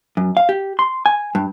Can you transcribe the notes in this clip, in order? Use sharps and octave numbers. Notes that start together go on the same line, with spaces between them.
F#2
F5
G4
C6
G#5
G2